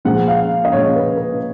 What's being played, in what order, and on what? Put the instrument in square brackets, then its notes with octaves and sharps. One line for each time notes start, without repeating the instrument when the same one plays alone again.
[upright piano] A#2 F3 G#3 F#5
F5
D#5
A#2 F3 G#3 C#5
B4
B4